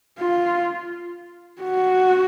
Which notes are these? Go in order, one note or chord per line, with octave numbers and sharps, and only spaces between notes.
F4
F#4